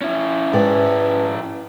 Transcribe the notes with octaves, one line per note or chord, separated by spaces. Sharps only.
C#4 E4
G#2 B4 D5 G5